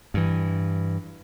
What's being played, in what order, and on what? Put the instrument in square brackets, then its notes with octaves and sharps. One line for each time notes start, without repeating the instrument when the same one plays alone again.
[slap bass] G2 E3